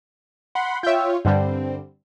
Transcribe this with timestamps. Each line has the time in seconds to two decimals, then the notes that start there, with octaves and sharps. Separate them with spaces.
0.55 F#5 B5 C6
0.83 F4 C#5 E5 G5
1.25 G2 D3 G3 C4